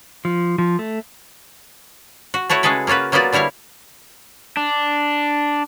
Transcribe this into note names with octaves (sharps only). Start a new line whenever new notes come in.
F3
F3
A3
F#4
A3 E4 F#4 C#5 F#5
C#3 G#3 G#4 A4 B4
A#3 C#4 F4 F#4 B4
F#3 A#3 B3 F4 F#4 D5
D3 G3 E4 C#5 F5
D4